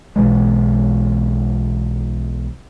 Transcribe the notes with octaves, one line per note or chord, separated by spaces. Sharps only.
B1 B2 E3 G#3